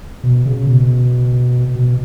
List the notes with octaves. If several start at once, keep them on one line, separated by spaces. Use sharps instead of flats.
B2
C#3
B2
B2